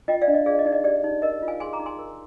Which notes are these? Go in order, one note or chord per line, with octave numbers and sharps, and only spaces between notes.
F4 D#5 G5
D5 F5
D4
D#5
G#4 D5 F5
D#5
D#4 D5
D#5
G4 D5
D#4
A#4 D#5
F4
F5 G#5
G#4 G#5 C6
A#5 D6
D#4
G#5 C6
A#4